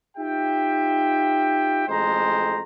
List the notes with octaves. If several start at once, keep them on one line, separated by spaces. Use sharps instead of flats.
D#4 F4 G4 E5 G5
A1 F2 G#3 G4 C5 A#5